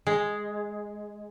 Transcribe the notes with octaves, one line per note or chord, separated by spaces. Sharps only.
G#3